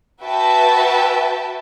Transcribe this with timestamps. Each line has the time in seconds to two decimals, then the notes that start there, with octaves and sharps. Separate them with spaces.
0.22 F#4 B4 E5 G5 A5